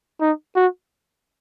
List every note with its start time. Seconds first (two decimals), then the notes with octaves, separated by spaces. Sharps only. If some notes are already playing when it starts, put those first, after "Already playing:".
0.21 D#4
0.56 F#4